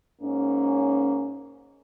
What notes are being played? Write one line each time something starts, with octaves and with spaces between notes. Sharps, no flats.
G#2 A#3 C#4